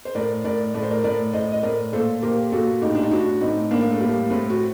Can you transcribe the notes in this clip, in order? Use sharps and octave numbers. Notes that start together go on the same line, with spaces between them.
C5
A2 A#4 D5
A2 A#4 D5
A2 D5
C5
A#4 D5
A2 A#4 D5
A2 C5 D#5
D#5
A2 A#4 D5
A#2 A4 C5
A#2 G4 A#4
A#2 F#4 A4
A2 D#4 G4
D4
D#4
A2 D4 F#4
A2 C4 D#4
A2 A#3 D4
A3
A2 G3 A#3
A2 A3 C4
F#4